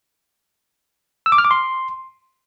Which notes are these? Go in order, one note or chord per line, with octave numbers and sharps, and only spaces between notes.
E6
D6
F6
D6
C6